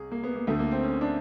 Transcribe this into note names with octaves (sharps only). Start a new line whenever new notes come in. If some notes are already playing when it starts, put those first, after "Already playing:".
Already playing: C2 G#4
A#3
B3
A#3
D2 D3 A3
A#3
C4
C#4
D4